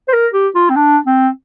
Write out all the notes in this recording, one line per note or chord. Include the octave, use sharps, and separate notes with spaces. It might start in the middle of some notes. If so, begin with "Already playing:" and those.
C5
A#4
G4
F4
C4
D4
C4